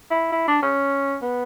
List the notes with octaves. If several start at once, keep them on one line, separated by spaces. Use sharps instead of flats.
E4
E4
D4
C#4
B3